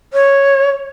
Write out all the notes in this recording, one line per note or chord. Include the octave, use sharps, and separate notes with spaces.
C#5